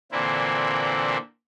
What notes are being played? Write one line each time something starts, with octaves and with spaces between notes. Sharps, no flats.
A#2 D3 E3 A#3 C4 E4